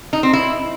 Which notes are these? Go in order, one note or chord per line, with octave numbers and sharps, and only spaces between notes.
D#4
C4
E4